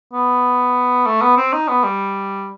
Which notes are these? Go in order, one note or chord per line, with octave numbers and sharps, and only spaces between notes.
B3
A3
B3
C4
D#4
B3
G3